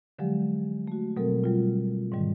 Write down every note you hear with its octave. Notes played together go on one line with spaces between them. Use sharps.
D3 F3 F#3 G#3 G4
A3 F#4
B2 F#3 G3 C4 A4 A#4
F#3 G3 F4
G#2 D3 D#3 G3